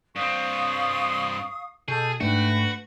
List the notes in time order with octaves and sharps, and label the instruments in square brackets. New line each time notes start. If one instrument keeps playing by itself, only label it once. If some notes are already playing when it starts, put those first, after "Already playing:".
[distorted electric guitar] G2 C4 [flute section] F5 C#6 D#6
[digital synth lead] B2 [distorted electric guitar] G#4 [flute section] A4 G6
[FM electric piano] G#2 D4 [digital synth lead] A3 [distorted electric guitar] F#4 [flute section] B4 G5